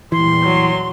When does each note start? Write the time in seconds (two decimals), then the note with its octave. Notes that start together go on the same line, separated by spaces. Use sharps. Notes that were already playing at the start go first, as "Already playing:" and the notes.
0.12 E2 A#2 E3 G3 C6
0.43 F#3